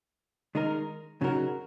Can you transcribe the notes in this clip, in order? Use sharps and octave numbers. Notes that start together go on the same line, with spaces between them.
D#3 G#3 D#4 A#4
C#3 F#3 D#4 F#4 A#4